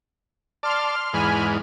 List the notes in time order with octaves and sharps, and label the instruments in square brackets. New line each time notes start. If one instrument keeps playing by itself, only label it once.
[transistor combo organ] D5 A5 [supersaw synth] C6 F6
[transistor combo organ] E2 G#2 [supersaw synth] G#5 B5 F6